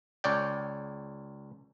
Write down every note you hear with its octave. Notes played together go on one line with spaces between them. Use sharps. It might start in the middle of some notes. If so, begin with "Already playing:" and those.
C#2 C#5 D5 G5